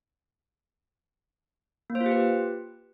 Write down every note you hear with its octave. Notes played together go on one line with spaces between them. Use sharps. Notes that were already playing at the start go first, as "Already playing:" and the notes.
A#3
C5
F4
G4
B4